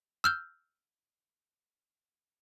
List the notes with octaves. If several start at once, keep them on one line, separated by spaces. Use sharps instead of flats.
E6 F6 G6